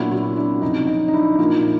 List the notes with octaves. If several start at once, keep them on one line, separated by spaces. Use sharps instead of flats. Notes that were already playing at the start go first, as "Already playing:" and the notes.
Already playing: A#2 F#3 B3 D4 E4 F#4
E4 F#4
D4 E4
F2 C#3 F#3 D#4
D#4
D#4
D4 E4
A#2 F3 A#3 D4 D#4 F4